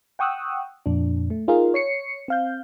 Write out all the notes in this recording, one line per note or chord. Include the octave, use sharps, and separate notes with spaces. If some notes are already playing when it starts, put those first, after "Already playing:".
F#5 G5 C#6 D#6 E6 F#6
F2 A#2 D4
A3
D#4 F4 G#4 A#4 F5
C#5 C7 C#7
C4 F5 G6